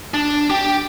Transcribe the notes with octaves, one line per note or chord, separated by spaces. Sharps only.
D4
G4 G5